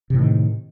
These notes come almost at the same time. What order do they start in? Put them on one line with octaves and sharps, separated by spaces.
C3 A2 D#3